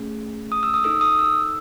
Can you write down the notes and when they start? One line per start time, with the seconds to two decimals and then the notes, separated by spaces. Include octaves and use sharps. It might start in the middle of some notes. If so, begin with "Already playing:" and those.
Already playing: A3 C#4 G#4
0.52 D#6
0.63 E6
0.74 D#6
0.84 D#4 A4 E6
1.01 D#6
1.19 E6